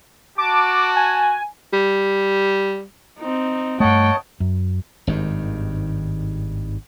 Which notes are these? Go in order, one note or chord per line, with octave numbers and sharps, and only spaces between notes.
F#4 A5 D6
G#5
G3
C4 D#4
G2 A3 C#5 D#5 F#5 G5 A5
F#2
G#1 G2 D#3